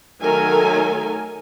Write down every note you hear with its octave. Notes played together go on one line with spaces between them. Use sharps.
D#3 F#3 A3 A4 A#4 G#5